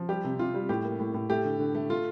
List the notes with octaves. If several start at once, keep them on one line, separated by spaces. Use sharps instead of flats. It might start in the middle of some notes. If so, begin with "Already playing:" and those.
Already playing: F3
G3 G4
C3
C3 F4
G3
A2 G4
A#3
A2
A2
A3 G4
D3
D3
A3
A3 F4